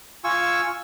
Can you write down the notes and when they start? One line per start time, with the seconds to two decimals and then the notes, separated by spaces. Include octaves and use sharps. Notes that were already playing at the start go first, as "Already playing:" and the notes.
0.24 F4 G#5 C#6 E6